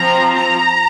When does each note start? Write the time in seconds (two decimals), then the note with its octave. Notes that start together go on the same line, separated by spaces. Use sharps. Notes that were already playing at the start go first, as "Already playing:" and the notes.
Already playing: F3 C4 A#5
0.36 A#5